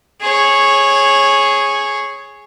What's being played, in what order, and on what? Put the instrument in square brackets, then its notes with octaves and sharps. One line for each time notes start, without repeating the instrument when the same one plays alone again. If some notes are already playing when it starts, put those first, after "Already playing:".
[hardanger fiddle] G#4 C#5